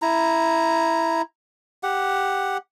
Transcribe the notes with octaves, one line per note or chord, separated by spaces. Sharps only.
E4 A#5
G4 F#5